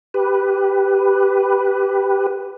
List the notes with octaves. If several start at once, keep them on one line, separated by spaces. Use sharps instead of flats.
G4 B4